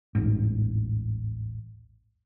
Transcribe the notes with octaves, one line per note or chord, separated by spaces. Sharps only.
D#1 A1 G#2